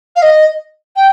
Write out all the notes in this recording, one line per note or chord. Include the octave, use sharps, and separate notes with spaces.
F5
D#5
G5